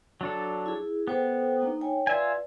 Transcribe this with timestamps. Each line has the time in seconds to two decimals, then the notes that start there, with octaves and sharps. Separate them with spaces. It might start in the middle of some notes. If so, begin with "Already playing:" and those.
0.21 F#3 D4 A4
0.66 E4 G#4
1.07 B3 A4 C5 G5
1.62 A#3 D4 D#4
1.81 C#5 G5 G#5
2.07 F4 B4 D5 E5 G#5